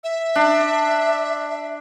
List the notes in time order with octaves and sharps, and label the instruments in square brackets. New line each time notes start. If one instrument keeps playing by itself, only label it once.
[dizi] E5
[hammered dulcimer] D4